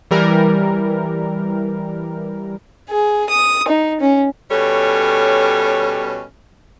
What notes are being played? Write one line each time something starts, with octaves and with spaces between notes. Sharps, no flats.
E3 G3 A#4
G#4
D#6
D#4
C#4
B2 G3 C#4 A4 C#5